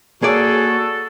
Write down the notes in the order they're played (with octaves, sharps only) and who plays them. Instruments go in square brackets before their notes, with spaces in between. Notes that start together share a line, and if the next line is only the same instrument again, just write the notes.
[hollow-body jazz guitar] A#3 C#5 D5 [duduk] F#4 [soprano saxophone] G#4 [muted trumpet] A4